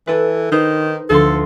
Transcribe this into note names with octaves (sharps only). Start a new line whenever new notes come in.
E3 A4 B4
D#3 D#4 B4 C5
D2 F3 A4 C6